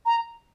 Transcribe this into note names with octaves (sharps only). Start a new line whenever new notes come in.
A#5